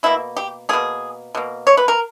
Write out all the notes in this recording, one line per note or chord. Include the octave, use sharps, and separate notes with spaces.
B2 A#3 E4
G4
B2 A#3 G#4
B2 A#3
C#5
B4
A#4